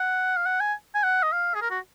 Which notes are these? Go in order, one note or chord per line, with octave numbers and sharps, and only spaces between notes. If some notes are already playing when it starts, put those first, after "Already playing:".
Already playing: F#5
F5
F#5
G#5
G#5
F#5
D#5
F5
G#4
A#4
F#4